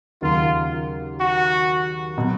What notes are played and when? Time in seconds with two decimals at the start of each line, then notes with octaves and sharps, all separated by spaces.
0.21 D#2 C#3 F#3 A#3 D#4 F4
1.19 F#4
2.18 B2 F#3